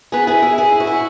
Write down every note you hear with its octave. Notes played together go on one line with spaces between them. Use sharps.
B3 G#4 B4
E4 G#4 B4
E4 G#4
E4 G#4
E4
F#4
E4